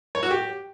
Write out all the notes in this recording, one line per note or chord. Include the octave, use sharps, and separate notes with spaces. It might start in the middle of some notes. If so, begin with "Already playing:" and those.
C#5
F#4
G4